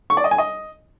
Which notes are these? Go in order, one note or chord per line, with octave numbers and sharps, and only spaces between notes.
C#6
D5
D#5
G#5
D#5